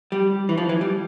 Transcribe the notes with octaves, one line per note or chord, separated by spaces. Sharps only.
G3
E3
F3
E3
G3